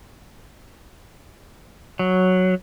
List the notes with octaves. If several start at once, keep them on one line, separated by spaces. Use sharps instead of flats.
F#3